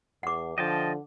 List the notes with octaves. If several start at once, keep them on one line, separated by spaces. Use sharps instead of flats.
E2 F#5 D6
D3 F3 D#5 G5 A5